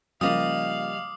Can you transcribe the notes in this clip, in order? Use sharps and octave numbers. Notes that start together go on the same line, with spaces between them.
C#3 F3 G3 A#3 D#5 F5 D6 D#6